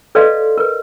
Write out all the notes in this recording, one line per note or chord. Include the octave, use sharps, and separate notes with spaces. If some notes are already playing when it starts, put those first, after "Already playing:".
A4 B4 D5 D#5 F5 C6
A#4 B4